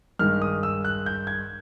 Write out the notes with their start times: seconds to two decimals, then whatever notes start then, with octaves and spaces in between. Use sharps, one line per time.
0.19 G2 D#3 G#3 F6
0.42 D#6
0.63 E6
0.85 F#6
1.06 G6
1.27 G#6